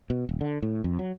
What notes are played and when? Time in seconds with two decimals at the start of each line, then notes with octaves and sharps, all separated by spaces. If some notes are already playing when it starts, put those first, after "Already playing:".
0.10 B2
0.29 D#1
0.41 D3
0.62 A2
0.84 F2
0.99 F#3